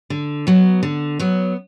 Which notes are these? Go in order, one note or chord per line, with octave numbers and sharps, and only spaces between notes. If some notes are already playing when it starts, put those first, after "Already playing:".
D3
F#3 B3
D3
F#3 B3